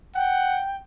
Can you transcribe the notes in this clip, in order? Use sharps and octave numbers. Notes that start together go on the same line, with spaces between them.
F#5 G5